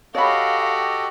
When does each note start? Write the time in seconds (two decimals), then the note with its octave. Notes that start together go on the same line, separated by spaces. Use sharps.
0.15 F#4 G4 A4 C#5 D#5 F5 B5